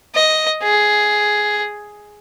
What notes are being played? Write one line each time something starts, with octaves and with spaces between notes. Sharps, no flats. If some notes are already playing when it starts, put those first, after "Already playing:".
D#5
G#4